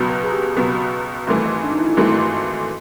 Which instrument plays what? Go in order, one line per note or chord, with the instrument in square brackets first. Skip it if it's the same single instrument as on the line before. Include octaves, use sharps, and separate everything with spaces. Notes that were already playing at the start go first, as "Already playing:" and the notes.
Already playing: [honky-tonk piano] C#2 B2 F#3 B3
[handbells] B4
G#4
G4
[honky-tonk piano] C#2 B2 F#3 B3 [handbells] F#4
[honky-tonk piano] G#1 G#2 E3 A3
[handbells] D4
D#4
E4
F4
[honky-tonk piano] G#1 G#2 E3 A3 [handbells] F#4